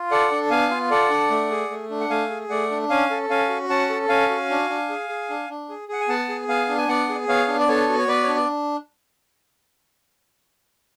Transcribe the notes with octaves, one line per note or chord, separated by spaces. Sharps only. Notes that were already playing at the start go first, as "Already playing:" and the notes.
Already playing: F4
A4 D5 F#5
D4
B3 F5 G#5
F4
A4 D5 F#5
D4
A3
G#4
A3
D4
F#5
A3 F5 G#5
G#4
A3 D5 F#5
D4
C#4 F5 G#5
A4
C#4 F5 G#5
F#4
C#4 F#5 A5
A4
C#4 F5 G#5
F#4
D4
D4
G#4
G#4
D4
D4
G#4
G#4 F#5
G#5
B3 F#5 A5
G#4
B3 F5 G#5
D4
G#5
B3 D5 F#5
G#4
B3 C#5 F5
D4
D5
B3 A4 C#5
F#4
C#5
B3 B4 D5
D4 C#5
D5